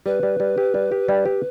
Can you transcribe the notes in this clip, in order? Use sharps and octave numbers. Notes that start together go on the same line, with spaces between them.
G3 B4
G3
G3
G4
G3
G4
G3
G4